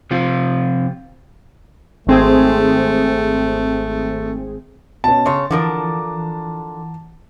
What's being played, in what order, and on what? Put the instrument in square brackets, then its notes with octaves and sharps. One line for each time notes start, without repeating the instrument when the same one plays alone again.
[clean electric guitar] C3 F3 F4
[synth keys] G#1 C4 G#4 [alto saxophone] A3
[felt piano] B2 B3 C#4 [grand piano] A5
[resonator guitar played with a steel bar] C#3 C#5 [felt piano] C6
[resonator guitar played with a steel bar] D3 F3 A#4 [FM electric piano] E3 [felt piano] F#5 D6